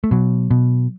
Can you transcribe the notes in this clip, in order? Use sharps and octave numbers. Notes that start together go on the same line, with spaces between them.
A3
B2 F#3
B2